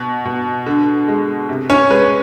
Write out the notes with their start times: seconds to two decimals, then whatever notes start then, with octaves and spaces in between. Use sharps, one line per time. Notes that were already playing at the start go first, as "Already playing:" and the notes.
Already playing: B2
0.25 B2
0.66 D3
1.08 G#3
1.49 C3
1.70 C#4 C#5
1.90 G#3 B4